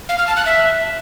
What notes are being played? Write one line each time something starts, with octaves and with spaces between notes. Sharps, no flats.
F5
F6
A5
F#6
E5